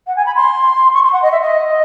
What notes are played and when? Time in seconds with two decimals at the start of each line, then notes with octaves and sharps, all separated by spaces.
0.07 F#5
0.16 G#5
0.26 B5
0.35 C6
0.93 C#6
1.03 C6
1.13 F#5
1.22 D#5
1.32 E5
1.42 D#5